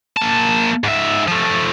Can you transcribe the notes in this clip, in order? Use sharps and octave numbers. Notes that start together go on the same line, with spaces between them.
A#3 A5
G#2 E5
F3 A3